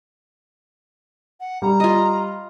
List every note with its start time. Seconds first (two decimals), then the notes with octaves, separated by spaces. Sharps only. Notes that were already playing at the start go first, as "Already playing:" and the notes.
1.40 F#5
1.62 G3 A#5
1.80 F4 D#5